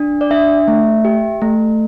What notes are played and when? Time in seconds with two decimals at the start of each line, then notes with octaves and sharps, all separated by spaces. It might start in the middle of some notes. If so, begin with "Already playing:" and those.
Already playing: D4
0.21 D5
0.31 D4 E5
0.68 A3
1.05 G4
1.42 A3